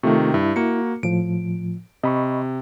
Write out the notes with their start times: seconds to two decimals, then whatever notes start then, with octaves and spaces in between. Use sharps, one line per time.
0.03 C3 D#3 A3 F4 C#6
0.34 G2 E4
0.56 A#3 F#4 C#7
1.03 A2 F3 D7
2.04 C3 D#5 B5 C#6